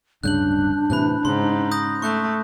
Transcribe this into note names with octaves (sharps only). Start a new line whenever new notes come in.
D1 G2 C#3 D4 F#6 G6 F#7
A2 C3 E3 B5 F#6
G#2 C#3 C6
D#6 G6 A#6
A3 C#6 F#6 G6